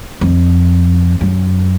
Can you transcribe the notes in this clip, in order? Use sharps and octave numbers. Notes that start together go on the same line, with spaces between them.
F2
F#2